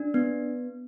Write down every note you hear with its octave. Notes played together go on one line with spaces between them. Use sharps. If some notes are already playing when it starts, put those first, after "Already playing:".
Already playing: D4
B3